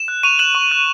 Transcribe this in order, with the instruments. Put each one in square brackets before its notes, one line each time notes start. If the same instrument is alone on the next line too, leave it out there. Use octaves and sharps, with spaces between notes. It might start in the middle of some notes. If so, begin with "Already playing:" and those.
Already playing: [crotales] E7
F#6
C#6 D#7 F7
F#6 E7 F#7
C#6
F#6